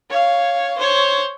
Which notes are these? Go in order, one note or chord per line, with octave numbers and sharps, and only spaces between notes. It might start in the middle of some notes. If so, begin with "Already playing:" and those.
C#5 F5
C5 C#5